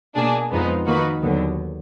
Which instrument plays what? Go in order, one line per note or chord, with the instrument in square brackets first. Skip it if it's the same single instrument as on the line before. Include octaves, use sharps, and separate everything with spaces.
[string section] B2 A#3 D4 G#4
F2 F3 G#3 B3 D#4
D#3 A#3 D#4 F#4 B4
D#2 D3 F#3 B3